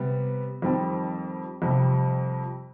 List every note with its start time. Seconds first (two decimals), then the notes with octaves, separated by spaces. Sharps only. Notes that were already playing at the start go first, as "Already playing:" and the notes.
Already playing: C3 G3 B3
0.62 F2 D#3 G3 C4
1.62 F2 C3 G3